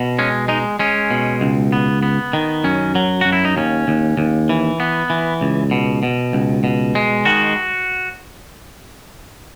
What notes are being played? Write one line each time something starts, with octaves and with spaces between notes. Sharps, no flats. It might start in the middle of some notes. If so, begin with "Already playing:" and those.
Already playing: B2
G#3 C#4
G#3 D#4
G#3 C#4
B2
C#2
B3
B3
D#3
F#2 C#4
F#3
F#2 F#4
E4
D#4
D#2 C#4
D#2
D#2
E3
B3
E3
C#2
B2
B2
C#2
B2
G#3
D#3 F#4